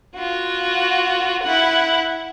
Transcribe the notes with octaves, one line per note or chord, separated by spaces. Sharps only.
F4 F#4
E4 F#5